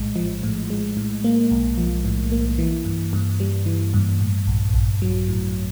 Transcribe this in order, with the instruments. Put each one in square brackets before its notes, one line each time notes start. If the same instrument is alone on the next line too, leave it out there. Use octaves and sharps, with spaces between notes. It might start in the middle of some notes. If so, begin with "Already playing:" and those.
Already playing: [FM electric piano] A#1 A2 G#3
F3
A2
G#3
A2
A#3
B1
F3
A2
A#3
E3
G2
G2
G3
E3
G2
A2
A#1
A#1
F#3
A2